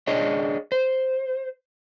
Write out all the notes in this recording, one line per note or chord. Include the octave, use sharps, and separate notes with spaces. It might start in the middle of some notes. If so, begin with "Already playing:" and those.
D4 G#4 C#5 D#5
C5